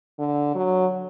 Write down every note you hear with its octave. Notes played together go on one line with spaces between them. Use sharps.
D3
F#3